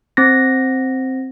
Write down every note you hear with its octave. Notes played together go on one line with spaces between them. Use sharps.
C4 A#6